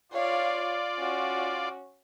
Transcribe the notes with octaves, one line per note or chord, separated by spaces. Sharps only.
F4 C#5 D5 F5
C#4 F#4